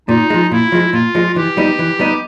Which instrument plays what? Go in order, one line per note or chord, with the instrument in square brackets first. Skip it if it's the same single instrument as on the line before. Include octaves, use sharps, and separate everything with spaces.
[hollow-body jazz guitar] A#2 [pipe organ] D#4
[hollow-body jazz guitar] F3 G#3
[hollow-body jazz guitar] A#2 [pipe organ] E4
[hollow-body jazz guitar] F3 G#3
[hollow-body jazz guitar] A#2 [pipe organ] F4
[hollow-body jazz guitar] F3 G#3
[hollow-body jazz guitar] E3 [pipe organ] G4
[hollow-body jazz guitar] G3 B3 D#4
E3
G3 B3 D#4